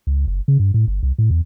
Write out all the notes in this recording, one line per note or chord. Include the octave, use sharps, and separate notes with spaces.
C#2
F#1
C#3
G2
A2
G1
C2
A2
E2